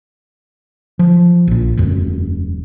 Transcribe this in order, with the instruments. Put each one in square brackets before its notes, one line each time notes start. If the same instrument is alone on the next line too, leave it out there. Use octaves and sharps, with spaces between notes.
[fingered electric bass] F3
A#1 A#2
E1 F#2